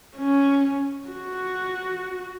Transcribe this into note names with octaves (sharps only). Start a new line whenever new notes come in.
C#4
F#4